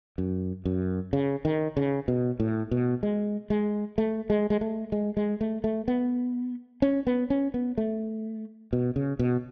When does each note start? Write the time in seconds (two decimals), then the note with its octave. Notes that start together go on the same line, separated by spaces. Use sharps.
0.18 F#2
0.65 F#2
1.13 C#3
1.45 D#3
1.77 C#3
2.08 B2
2.40 A2
2.71 B2
3.03 G#3
3.50 G#3
3.98 A3
4.30 G#3
4.50 G#3
4.61 A3
4.92 G#3
5.17 G#3
5.41 A3
5.64 A3
5.88 B3
6.82 C#4
7.07 B3
7.30 C#4
7.54 B3
7.78 A3
8.73 B2
8.96 C#3
9.19 B2